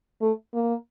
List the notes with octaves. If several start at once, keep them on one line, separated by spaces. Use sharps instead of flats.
A3
A#3